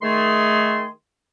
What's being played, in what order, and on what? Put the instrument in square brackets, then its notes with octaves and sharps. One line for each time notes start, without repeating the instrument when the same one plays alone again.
[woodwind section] D#3 A3 G#4 C6